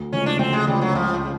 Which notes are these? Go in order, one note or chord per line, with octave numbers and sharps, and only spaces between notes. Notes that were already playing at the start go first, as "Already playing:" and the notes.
Already playing: D2
C#3 F3 G#3 C#4
D4
D2 C4
G#3
C#3 F3 G3 G#3
F#3
C#2 F3
C#3